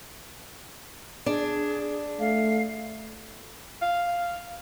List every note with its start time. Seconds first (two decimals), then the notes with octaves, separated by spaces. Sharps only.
1.26 D4 G#4
2.20 A3 F5
3.82 F5